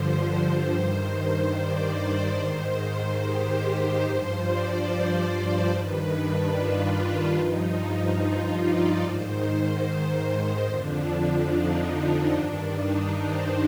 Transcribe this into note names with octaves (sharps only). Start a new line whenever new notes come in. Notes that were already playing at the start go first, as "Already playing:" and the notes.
Already playing: G2 D3 F3 C5
G2 D#3
D5
C5
G#2 D#3
G4
G2 F3 C5
D5
C5
G2 D#3 B4
D4
F4
G2 F3 D#4
F4
D5
G#2 D#3 C5
C5
C5
F2 D3 F3 D4
D4
D#4
G2 D#3 D4
D#4
C5